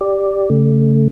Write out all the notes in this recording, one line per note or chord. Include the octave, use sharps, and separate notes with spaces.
G4 D5
C#3 A3